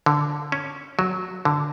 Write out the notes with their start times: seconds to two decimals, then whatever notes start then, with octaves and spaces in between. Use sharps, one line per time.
0.06 D3
0.52 C#4
0.99 F#3
1.45 D3